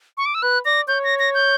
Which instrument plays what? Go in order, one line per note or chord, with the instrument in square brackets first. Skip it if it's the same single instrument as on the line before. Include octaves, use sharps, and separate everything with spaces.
[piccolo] C#6
D6
E6
[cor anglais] B4 [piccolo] F#6
[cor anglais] D5 [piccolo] A#6
[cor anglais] C#5 [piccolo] G6
[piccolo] A#6
A#6
G6